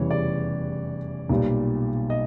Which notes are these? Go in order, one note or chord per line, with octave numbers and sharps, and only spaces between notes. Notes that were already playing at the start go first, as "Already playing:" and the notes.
Already playing: F1 E2 C#3 E3 G3 C#5
D5
B1 A#2 G3
D#5